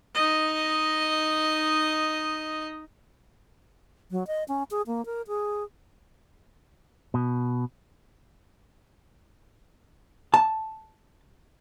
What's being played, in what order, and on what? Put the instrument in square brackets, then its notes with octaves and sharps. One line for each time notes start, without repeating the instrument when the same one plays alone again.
[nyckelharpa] D#4 D#5
[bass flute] F#3
D#5
C#4
G#4
A#3
A#4
G#4
[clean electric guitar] B2
[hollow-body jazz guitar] A5